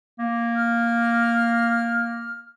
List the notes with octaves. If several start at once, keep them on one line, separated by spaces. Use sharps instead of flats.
A#3
F6